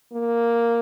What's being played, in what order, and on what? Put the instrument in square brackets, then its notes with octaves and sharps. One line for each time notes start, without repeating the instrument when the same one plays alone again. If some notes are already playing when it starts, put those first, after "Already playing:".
[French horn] A#3